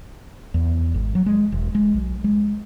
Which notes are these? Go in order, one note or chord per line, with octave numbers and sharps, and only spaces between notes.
E2
G#1
F#3
G#3
E1
G#3
B1
G#3